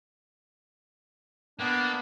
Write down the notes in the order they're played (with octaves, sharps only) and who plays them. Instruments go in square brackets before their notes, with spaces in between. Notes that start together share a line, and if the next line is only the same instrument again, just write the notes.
[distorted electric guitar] A#3 [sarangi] B3 [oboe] D4